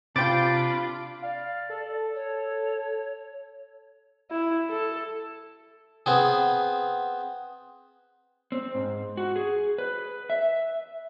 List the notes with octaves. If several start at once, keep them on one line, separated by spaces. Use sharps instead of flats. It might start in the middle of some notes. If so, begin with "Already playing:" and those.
C3 D4 F4 G5 B5 D6 A6 D7
D5 F5
A4
C#5
E4
A4
B3 C4 G#4
C4
G#2
F#4
G#4
B4
E5